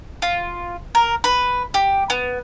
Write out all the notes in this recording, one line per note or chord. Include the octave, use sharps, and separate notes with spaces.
F4
A#4
B4
G4
B3